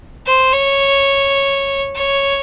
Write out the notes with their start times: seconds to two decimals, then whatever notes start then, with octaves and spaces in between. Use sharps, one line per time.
0.26 C5
0.53 C#5
1.95 C#5